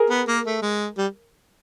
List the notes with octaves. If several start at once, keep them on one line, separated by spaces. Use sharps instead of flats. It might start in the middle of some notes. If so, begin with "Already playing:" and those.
Already playing: G#4 A#4
B3
A#3
A3
G#3
G3